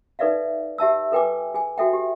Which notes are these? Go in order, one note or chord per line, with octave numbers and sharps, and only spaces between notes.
D#4 A4 B4 D5 E5 F5
G4 E5 A5 E6
A4 B4 G5 G#5 D6
G#4 G#5
F#4 A4 E5 G5
G4